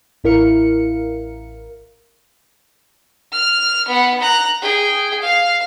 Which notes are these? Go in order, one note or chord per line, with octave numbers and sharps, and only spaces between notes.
A1 E4 A#4 F5 C#7
F6
B3 F#5
A#5 F#6
G#4 G5
F5